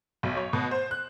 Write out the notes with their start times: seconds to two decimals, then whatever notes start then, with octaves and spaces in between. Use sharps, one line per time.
0.23 B1
0.37 C#5
0.53 B2
0.71 C5
0.91 F#6